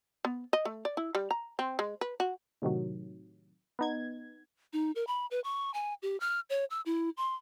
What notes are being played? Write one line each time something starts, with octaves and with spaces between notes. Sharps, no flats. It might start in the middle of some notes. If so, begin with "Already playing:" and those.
B3
D#5
A3
D5
E4
G3
A#5
C4
G#3
B4
F#4
A2 C3 D#3 F#3
B3 D#4 G#6
D#4
A#4
B5
B4
C#6
G#5
G4
F6
C#5
E6
E4
C6